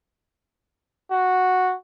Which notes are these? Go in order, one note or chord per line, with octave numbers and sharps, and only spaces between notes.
F#4